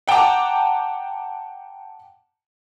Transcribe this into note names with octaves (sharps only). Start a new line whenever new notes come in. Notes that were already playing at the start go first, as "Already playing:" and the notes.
F#5 G5 A5 A#5 D6